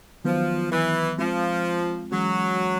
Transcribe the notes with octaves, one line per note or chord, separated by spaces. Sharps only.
D#3 F3 F#3 B3
E3
F3 G#3 C4 F4
E3 F#3 G#3 C#4 F#4